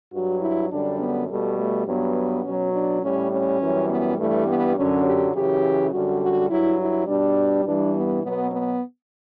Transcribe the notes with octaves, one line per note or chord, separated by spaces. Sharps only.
G2 F#3 F#4
E4
F#2 D3 G3 D4
B3
B2 G3 A3
A3
G2 F#3 B3
B2 F#3 C#4
D4
A2 G3 C#4
C#4
F#2 E3 G3
B3
G2 E3 G3 A3
B3
F#2 D3 F#3 C#4
G4
F#2 C#3 E3 G4
F#2 D3 G3 F#4
F#4
G2 F#3 E4
E4
B2 G3 D4
G2 E3 G3 D4
B3
B2 F#3 B3
B3